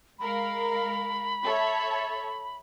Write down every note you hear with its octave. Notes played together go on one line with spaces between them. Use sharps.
G#3 A#4 F5 B5
A4 C#5 E5